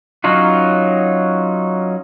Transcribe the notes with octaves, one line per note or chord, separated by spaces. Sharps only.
F#3 C#4 D#4 F4 F#4